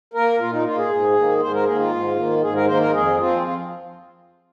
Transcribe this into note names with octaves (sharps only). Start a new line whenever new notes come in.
A#3 A#4
A#2 F4
D#4
A#3 F4
G#4
G#2
D#3 A#3
G#2 C5
A#4
D#3 A#3 G#4
F4
G#2
D#3 A#3
G#2 G#4
A#4
D#3 A#3 C5
A#4
F2 G#4
F3 C4 F4
F4